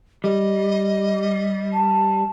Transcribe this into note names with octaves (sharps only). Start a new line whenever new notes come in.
G3 D#5
A5